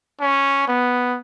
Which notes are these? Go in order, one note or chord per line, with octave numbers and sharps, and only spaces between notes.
C#4
B3